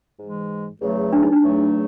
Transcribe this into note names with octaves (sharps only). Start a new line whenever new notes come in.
G#2 E3 G#3
E2 C#3 F#3 A3
D4
D#4
D4
E2 C#3 F#3 A3